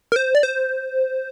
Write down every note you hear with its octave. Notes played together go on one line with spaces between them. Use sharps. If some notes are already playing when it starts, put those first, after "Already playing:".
A#4
C5
D5
C5